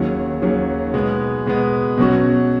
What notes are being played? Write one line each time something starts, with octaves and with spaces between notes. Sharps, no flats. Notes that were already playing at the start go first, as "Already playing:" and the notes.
Already playing: D#2 D#3 F#3 C#4 G#4
D#2 D#3 F#3 C#4 G#4
B2 G#3 B3
B2 G#3 B3
B2 F#3 C#4 F#4